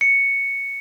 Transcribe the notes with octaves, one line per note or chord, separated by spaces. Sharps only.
C#7